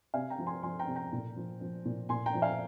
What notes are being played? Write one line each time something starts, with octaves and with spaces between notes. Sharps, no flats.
C3 F5 G#5
G5 A#5
F3
G#5 C6
F3 G#5 C6
G5 A#5
C3
G5 A#5
A#2
F3
F3
A#2
A#2 G#5 C6
G5 A#5
F3
F5 G#5